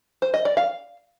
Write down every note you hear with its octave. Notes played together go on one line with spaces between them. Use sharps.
C5
D#5
D5
F5